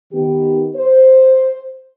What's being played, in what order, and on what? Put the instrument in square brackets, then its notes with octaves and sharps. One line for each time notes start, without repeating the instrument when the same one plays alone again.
[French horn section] D#3 B3 G4
C5